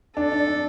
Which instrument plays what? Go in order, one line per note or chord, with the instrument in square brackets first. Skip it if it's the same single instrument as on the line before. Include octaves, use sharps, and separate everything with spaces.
[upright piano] D4 [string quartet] A4
[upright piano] D4
D4